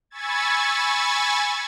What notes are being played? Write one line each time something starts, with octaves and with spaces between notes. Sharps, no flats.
G#5 B5 C#6 E6 G#6 A6